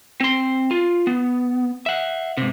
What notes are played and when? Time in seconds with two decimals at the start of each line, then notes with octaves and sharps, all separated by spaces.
0.20 C4 C6
0.71 F4
1.07 B3
1.86 E5 F#5
2.37 G#2 C3